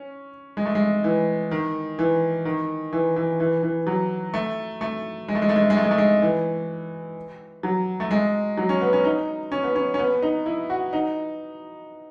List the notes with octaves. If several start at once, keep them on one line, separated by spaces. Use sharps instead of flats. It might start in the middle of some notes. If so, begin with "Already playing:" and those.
Already playing: C#4
G#3
A3
G#3
E3
D#3
E3
D#3
E3
E3
E3
E3
F#3
A3
A3
G#3
A3
G#3
A3
G#3
A3
G#3
A3
G#3
A3
G#3
E3
F#3
A3
G#3
F#3
C#4
B3
C#4
D#4
C#4
B3
C#4
C#4
B3
D#4
E4
F#4
D#4